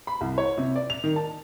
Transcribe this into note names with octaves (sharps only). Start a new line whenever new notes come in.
B5
C2
C#5
C3
D5
F7
D#3
A5